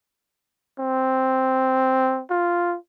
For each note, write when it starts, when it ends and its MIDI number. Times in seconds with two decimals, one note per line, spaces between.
0.79 2.22 60
2.30 2.76 65